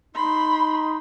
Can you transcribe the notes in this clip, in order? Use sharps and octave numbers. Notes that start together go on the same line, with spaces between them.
D#4 B5 C6